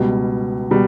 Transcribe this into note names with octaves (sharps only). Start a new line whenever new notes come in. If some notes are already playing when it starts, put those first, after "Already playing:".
Already playing: C#2 B2 G3
B2 G3